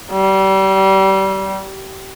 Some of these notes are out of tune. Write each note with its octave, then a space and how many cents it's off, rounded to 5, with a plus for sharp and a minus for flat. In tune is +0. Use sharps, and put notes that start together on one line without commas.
G3 -30